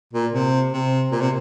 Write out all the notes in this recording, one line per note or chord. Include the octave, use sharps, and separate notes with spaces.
A#2
C3
C3
A#2
C3